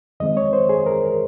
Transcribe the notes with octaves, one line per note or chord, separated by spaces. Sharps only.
F2 D#3 G#3 C4 D#5
C#5
C5
G#4
A#4